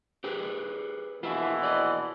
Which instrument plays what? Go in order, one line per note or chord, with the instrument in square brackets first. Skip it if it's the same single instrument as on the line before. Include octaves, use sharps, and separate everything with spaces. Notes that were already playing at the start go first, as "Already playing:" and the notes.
[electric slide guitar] G4 G#4 B4
[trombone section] A#1 B2 E3 [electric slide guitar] E4 F4
[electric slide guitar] D5 D#5